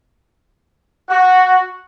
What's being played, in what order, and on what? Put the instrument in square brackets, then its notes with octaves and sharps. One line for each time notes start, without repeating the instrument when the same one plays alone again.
[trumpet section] F#4